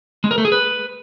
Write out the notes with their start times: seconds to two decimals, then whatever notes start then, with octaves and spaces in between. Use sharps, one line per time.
0.24 G#3
0.31 A#4
0.38 A3
0.45 G#4
0.52 B4